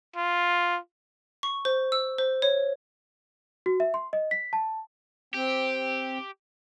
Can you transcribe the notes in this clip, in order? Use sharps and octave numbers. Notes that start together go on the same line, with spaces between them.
F4
C#6
C5
E6
C5
C#5
F#4
E5
C6
D#5
B6
A5
C4 G4